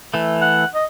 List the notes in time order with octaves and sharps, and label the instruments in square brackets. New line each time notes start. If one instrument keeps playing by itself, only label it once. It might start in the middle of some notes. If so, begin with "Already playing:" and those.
[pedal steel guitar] E3 A3
[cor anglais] F#5
D#5